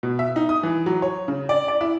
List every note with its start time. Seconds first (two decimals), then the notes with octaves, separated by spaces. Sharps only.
0.03 B2
0.19 E5
0.36 D#4
0.49 D#6
0.63 E3
0.86 F#3
1.02 C#5
1.28 C#3
1.49 D5
1.68 D5
1.81 E4